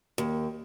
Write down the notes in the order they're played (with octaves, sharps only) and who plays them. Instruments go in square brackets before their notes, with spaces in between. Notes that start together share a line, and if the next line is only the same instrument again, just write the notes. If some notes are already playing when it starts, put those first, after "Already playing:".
[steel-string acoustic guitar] D#2